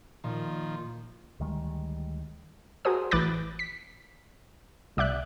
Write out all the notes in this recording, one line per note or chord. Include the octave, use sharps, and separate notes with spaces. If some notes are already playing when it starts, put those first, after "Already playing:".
A#2 D#3 F3
D2 D#3 G3 G#3
F#4 G#4 A#4 C5 D#6
A1 E3 B5 D6 F#6 A6
B6
C2 D5 E5 F#6